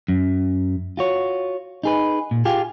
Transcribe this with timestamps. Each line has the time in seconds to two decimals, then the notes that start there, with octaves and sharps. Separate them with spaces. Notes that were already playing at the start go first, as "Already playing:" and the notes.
0.08 F#2
0.97 F4 F#4 C#5
1.84 D#4 G#4 B4
2.31 A#2
2.45 F4 G4 G#4